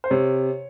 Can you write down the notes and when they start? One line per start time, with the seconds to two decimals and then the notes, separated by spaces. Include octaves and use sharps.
0.04 C5
0.10 C3 C#5